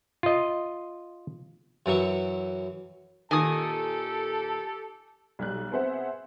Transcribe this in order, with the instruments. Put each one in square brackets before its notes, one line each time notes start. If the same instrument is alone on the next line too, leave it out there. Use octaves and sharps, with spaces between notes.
[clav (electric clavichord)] F4 D#5
[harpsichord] F#2 E3 F#3 C#6
[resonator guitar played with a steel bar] A#2 D#3 [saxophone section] G4 A4 [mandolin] G#5 D#6 [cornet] A5
[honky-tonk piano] B1 G3 F#6
B3 C4 G#4 C5 E5 F#5